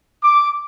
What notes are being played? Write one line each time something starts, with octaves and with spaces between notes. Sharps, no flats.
D6